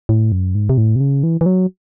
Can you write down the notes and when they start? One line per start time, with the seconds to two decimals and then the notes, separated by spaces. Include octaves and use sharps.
0.09 A2
0.32 F#2
0.55 G#2
0.69 C3
0.78 A2
0.96 C3
1.00 C#3
1.23 E3
1.41 E3
1.46 F#3